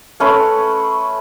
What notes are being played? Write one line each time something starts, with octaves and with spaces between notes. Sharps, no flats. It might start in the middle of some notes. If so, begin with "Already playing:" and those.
A3 C#4 B4 C6